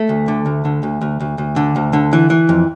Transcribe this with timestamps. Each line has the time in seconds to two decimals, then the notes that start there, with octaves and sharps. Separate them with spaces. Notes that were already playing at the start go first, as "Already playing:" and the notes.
Already playing: A3
0.09 D2
0.28 D3
0.46 D2
0.65 D3
0.83 D2
1.02 D2
1.21 D2
1.38 D2
1.56 D3
1.76 D2
1.93 D3
2.13 E3
2.30 E3
2.49 F2